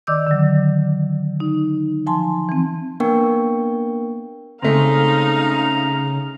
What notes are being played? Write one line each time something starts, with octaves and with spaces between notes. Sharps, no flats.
D#3 D5 D#5 D6 E6 G6
D3 F#3
D#4
F3 G#5 A5 C6
E3 C4
A#3 B3 D4 A#4 G5 C#6
C#3 G#3 A3 C4 D#4 F5 A#5